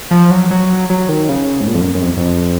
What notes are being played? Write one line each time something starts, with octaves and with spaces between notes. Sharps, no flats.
F3
F#3
F#3
F#3
D#3
C#3
G#2
A#2
F2
F#2
F#2
F2
F2